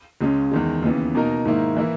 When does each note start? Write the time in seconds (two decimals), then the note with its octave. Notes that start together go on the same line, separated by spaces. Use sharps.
0.21 C#2 C#3 G#3 C#4
0.52 E2 D#3 G#3
0.82 D#2 C#3 E3 B3
1.15 B2 A#3 D#4 A#4
1.45 G#2 D#3 A#3 E4
1.77 E3 A#3 E4